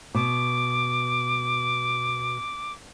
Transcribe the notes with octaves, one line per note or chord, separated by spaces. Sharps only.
B2 D6